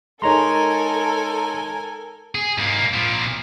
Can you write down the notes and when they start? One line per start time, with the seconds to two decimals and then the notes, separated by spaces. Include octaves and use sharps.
0.22 G#3 D#4 A4 A#4 C#5 G#5 A#5 C6
2.35 G#4
2.58 G#2 A#3
2.94 A#2 F3